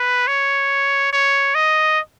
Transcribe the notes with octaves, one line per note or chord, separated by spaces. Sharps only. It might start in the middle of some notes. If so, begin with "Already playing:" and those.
Already playing: B4
C#5
C#5
D#5